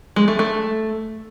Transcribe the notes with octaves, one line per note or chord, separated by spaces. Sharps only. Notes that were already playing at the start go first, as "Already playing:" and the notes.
G#3
A3
A3